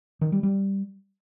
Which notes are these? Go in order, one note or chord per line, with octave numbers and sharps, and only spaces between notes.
D#3
G3
G3